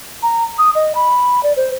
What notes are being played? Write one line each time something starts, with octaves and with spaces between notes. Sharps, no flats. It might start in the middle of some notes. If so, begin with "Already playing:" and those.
A#5
D#6
D#5
B5
D5
C5